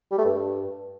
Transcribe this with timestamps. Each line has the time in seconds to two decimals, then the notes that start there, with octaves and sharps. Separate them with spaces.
0.11 G3
0.18 A3
0.26 G2